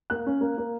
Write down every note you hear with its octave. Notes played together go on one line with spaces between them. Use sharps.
A#3 F#6
C#4
A#3
A#3